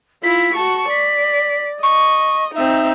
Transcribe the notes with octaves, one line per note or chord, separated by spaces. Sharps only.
E4 F4 B6
F#4 A5 C#6
D5 B6
D#5 C#6
C4 D#4 E5